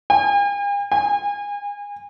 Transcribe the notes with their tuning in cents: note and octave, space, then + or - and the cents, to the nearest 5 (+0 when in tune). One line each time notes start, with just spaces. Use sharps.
G#5 -45
G#5 -35